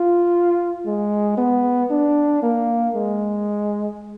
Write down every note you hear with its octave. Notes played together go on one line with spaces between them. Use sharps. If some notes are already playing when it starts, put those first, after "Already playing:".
Already playing: F4
G#3
B3
D4
A#3
G#3